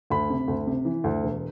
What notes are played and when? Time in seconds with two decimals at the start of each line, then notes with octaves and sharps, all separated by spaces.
0.10 D2 B5
0.30 C3
0.48 D2
0.67 C3
0.85 E3
1.04 D2
1.23 E1